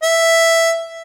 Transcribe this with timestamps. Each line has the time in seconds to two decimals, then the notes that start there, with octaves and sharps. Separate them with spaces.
0.02 E5